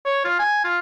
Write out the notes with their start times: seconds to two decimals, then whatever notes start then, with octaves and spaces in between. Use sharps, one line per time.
0.06 C#5
0.25 F4
0.39 G#5
0.64 F4